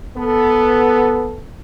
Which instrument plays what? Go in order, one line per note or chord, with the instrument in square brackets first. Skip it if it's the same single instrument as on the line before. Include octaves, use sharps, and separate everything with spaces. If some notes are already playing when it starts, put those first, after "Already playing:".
[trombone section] B3 A4